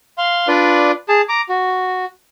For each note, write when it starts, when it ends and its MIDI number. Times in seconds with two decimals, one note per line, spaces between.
0.18 0.48 77
0.18 0.48 84
0.48 0.91 62
0.48 0.91 65
0.48 0.91 71
0.48 0.91 74
1.09 1.22 68
1.09 1.22 81
1.29 1.41 82
1.29 1.41 86
1.49 2.05 66